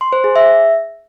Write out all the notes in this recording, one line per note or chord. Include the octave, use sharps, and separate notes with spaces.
C6
C5
G#4
E5